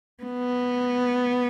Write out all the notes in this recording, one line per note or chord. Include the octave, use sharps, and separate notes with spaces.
B3